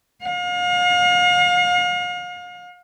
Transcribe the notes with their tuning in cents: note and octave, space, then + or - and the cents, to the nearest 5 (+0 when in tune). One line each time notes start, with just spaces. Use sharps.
F5 +40